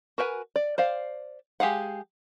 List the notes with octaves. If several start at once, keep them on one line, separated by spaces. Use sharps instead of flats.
F#4 A#4 B4 G5 G#5
D5
C5 D5 F5
G#3 G4 G#4 F5 F#5